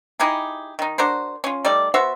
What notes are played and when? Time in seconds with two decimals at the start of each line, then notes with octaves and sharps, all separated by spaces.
0.20 D#4 E4 G4 G#4
0.79 D#3 D#4
0.98 D4 F#4 A#4 C5
1.44 C#4 F4
1.65 G3 A3 D#4 D5
1.94 B3 F#4 C5 E5